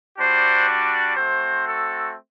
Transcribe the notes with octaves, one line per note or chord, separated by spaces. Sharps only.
G3 D4 F#4 C5
D5
A3 C4 F#4 C5
A4